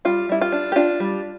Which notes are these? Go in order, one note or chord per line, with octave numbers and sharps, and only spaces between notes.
G3 F4
G3 E4
F4
D4
G4
D4 F4
G3